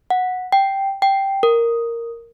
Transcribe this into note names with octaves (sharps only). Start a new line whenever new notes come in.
F#5
G5
G5
A#4